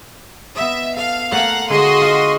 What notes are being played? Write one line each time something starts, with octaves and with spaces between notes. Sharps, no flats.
B3 D#5 E5
A4 F5
A3 A#3 A4 F5 F#5
D3 G#3 F#4 D#5 C6
F4